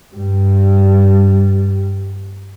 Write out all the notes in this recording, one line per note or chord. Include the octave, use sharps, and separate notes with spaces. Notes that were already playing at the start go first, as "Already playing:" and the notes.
G2 G3